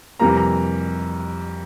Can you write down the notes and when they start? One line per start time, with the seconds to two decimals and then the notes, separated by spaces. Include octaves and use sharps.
0.20 F2 C3 E3 G3 A#3 A#5
0.37 A#5